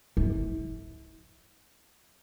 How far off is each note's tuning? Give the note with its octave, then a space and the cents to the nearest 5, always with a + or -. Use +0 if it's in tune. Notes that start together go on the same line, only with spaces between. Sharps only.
E4 -35